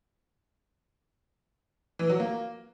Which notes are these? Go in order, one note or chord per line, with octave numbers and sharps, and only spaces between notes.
E3
F#3
A#3